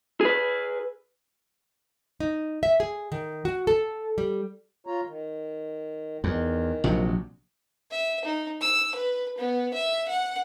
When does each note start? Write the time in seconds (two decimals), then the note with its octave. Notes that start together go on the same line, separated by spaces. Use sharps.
0.21 G#4 B4
2.20 D#4
2.63 E5
2.80 G#4
3.12 D#3
3.45 F#4
3.67 A4
4.18 G3
4.87 F4 C#5 A#5
5.07 D#3
6.24 E2 D#3
6.84 A#1 C3 F#3
7.91 E5
8.25 D#4
8.61 E6
8.95 B4
9.38 B3
9.74 E5
10.08 F#5